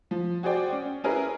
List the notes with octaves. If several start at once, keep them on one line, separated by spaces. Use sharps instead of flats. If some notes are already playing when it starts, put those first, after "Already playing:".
F3
F#4 G#4 C5 D5 G5
C#4
C#4 E4 G#4 A#4 B4